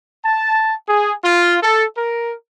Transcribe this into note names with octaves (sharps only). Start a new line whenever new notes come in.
A5
G#4
F4
A4
A#4